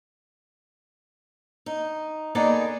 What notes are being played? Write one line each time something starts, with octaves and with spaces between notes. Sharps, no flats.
D#4
A#3 B3 D#4 G#4 A4 D5